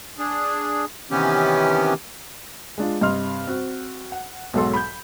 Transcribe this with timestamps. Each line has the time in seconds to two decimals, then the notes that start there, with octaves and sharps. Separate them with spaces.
0.19 D4 G#4
1.11 C3 D#3 E3 B3 C#4 G4
2.78 G#3 D4 F4
3.01 G2 C3 D#5 C6 F6
3.47 C4 F#4
4.12 F#5
4.54 B1 G#2 F#3 A4 C6
4.73 B5 G6